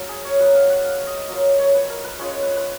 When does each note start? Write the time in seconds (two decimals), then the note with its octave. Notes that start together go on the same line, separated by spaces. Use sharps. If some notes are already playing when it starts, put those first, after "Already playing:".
Already playing: F#3 F4 A#4
0.09 G#4
0.25 C#5
0.39 F#3 B3 D#4 F#5
0.55 F5
0.70 F#5
0.84 F5
1.07 D#5
1.29 F#3 A#3 F4 D#5
1.59 C#5
1.74 B4
1.90 A#4
2.04 B4
2.19 G#3 C#4 F4 C#5
2.42 B4
2.57 B4